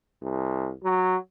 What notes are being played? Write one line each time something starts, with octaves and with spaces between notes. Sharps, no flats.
C2
F#3